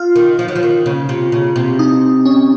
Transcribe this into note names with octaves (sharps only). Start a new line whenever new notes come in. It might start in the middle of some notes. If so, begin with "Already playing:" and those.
Already playing: F4
D#3
F3
F#3
F3
D#3
C#3
C3
C#3
C3
D#4
C#4